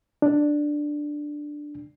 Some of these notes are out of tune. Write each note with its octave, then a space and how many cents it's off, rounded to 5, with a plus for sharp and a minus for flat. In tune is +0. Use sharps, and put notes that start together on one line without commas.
D4 +5